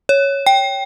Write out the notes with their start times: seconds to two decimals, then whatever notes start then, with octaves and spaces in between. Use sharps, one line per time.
0.09 C#5
0.46 G5